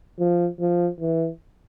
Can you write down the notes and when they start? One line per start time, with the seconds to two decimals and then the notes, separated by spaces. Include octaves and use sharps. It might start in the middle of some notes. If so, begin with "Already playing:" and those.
0.19 F3
0.60 F3
1.00 E3